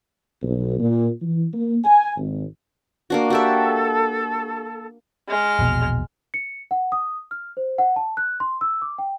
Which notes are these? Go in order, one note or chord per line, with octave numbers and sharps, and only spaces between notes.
B1
A#2
E3
A#3
G#5
G#1
A#3 D4 F#4
F#4 G4 A4 E5
G#3 F6
E1 A#1 B2
C#7
F#5
D#6
F6
C5
F#5
A5
F#6
C6
E6
D6
G5